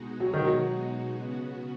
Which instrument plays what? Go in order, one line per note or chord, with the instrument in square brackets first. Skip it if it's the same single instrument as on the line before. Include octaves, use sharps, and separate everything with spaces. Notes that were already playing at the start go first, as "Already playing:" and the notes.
Already playing: [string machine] B2 G#3 D#4 F#4
[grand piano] F#3
D#3
F#3
[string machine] C#3 B3 F#4